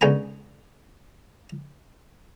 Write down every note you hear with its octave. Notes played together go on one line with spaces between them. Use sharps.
C#2 D3 D#4 G#5 A#5